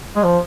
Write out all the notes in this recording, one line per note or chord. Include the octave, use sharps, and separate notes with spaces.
G#3
F3